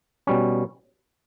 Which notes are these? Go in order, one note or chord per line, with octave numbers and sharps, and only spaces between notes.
B2 G3 C#4